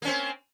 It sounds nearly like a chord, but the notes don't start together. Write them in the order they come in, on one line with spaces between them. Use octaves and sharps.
A#3 C#4 C4